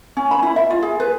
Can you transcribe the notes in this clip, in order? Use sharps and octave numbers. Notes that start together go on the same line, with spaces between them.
C#4
B5
E4
E5
F4
G#4
B4